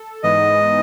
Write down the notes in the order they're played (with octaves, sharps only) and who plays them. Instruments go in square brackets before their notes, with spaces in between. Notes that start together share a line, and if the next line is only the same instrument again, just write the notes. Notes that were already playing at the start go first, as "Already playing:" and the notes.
Already playing: [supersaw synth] A4
[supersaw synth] G#2 E3 G#3 B3 D#4 [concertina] D#5